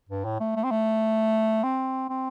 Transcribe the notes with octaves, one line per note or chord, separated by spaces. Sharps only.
G2
A2
A3
A3
C4
A3
C4
C4